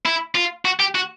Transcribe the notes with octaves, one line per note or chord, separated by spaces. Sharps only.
E4
F4
F#4
G4
F#4